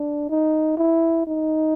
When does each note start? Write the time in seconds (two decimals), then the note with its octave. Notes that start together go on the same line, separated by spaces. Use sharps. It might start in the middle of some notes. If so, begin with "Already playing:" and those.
Already playing: D4
0.29 D#4
0.78 E4
1.27 D#4